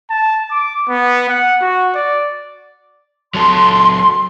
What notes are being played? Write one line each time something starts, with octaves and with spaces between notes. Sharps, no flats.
A5
D6
B3
F#5
F#4
D5
F#3 A4 C6